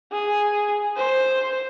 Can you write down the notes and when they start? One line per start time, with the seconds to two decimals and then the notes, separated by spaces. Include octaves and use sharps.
0.12 G#4
0.97 C5